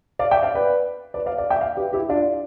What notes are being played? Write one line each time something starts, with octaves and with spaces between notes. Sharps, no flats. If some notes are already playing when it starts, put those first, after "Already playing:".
D5 F5
E5 G5
D5 F5
B4 D5
B4 D5
D5 F5
D5 F5
E5 G5
D5 F5
G4 B4
E4 G4
D4 F4